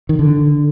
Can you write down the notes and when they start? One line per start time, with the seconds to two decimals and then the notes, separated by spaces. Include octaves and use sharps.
0.09 D#3
0.19 D3